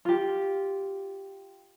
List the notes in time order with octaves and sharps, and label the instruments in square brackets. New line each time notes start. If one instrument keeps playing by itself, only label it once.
[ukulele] F4 G4